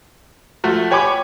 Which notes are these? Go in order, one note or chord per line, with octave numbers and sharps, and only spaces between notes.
F3 A3 F#4
G4 C#5 G#5 B5 D6